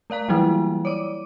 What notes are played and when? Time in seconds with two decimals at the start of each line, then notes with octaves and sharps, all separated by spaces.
0.10 A3 D5 F5 A#5
0.28 E3 F#3 G3 A#3 E4
0.85 C#5 D5 D6